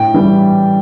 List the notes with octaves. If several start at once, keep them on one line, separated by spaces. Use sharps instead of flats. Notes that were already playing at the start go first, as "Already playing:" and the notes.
Already playing: A2 G5
E3 G3